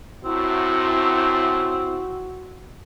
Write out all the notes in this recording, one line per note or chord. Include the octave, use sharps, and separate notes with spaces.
F#2 A2 C4 E4 F#4